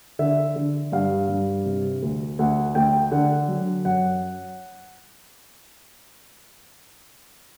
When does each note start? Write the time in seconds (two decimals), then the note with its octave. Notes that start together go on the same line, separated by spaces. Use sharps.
0.19 D3 E5
0.56 D3
0.92 G2 F5
1.29 G2
1.65 C3
2.02 D2
2.39 D2 F#5
2.75 D2 G5
3.12 D3 F#5
3.48 F#3
3.85 F#2 F#5